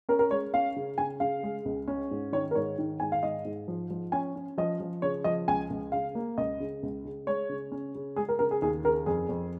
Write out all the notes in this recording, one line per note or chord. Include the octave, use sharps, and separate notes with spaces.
C#4 A#4
A#4
G#3 C#5
C#4 F5
C#3
C#3 G#5
C#3 F5
G#3
C#2
C#4
G#2
D#3 C#5
A#4
G#2 C#5
D#3
G#2 G#5
F5
G#2 D#5
G#2
F3
F3
C#4 G#5
C#4
F3 D#5
F3
C#3 C#5
F3 D#5
C#2 G#5
C#2
C#3 F5
A#3
C#2 D#5
C#3
C#2
C#3
G#3 C#5
C#3
C#4
C#3
G#3 G#4
A#4
C#3 A#4
G#4
D#2 G#4
C#3 A#4
F2 G#4
F2